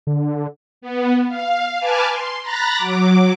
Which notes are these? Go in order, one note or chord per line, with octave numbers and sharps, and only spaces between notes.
D3
B3
F5
B4 G#5 A5 D6 F6
C6
A#5 B5 F#6 A6 A#6
F#3 D6